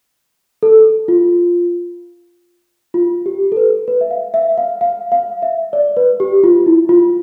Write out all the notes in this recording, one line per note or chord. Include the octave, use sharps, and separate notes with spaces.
A4
F4
F4
G4
A4
B4
B4
E5
F5
E5
F5
F5
F5
E5
D5
B4
G4
F4
E4
F4